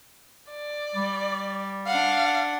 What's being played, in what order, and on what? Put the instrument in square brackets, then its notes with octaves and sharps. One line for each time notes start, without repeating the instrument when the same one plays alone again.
[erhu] D5
[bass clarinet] G3
[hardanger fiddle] D4 F#5 [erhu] F5